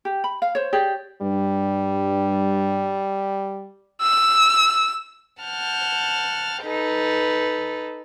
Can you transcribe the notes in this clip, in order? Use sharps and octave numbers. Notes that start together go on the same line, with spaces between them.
G4
B5
F5
C5 C#5
G4 G#4 C#5 D5
G2 G3
E6
F#5 A5 F6 G6
D#4 A4 B4